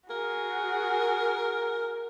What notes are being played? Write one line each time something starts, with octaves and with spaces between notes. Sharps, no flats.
F#4 G#4 A#4